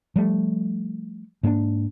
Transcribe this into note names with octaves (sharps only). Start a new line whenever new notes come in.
F3 G3 A3
G#2 A#3 C#4 D4